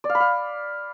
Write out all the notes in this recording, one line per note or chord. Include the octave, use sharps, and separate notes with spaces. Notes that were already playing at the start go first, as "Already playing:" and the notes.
D5
F5
B5
F5